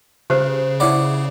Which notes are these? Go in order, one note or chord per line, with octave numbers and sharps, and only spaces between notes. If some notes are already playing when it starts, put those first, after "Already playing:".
C#3 G4 B4 C5
E4 C#5 D5 F#5 B5 D6